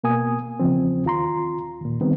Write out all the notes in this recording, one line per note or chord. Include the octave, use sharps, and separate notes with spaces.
B2 A#3 G#5 D#6
E2 C#3 F3 C4
D#2 F4 A#5 C6
D#2 A#2
D#3 G3 B3 C4